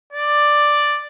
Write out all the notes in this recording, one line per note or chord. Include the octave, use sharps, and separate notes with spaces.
D5